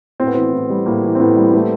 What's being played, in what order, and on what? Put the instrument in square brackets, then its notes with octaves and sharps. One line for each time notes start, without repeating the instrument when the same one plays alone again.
[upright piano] A2 [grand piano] C4
[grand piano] B3
[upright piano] E3 [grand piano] C4
[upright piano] A2
G3
[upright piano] A2 [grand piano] A#3
[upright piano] E3
[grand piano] C4
[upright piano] A2 [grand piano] B3
[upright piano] G3
A3